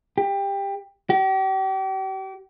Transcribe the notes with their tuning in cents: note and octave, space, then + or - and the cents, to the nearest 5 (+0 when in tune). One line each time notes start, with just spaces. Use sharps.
G4 +20
G4 -40